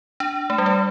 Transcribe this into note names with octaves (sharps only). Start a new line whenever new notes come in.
D4
A3
G3
A3